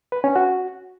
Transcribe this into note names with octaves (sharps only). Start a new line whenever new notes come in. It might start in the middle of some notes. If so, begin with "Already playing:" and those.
B4
C#4
F#4